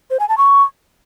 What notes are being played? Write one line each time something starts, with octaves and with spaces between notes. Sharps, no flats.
C5
G#5
A5
C#6